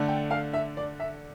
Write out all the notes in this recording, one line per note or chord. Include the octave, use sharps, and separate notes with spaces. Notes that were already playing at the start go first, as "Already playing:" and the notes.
Already playing: D3 A3 D4
G5
F5
E5
D5
E5